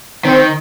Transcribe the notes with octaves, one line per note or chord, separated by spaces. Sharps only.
D#3 C4